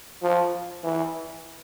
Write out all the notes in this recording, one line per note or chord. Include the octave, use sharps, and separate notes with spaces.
F3
E3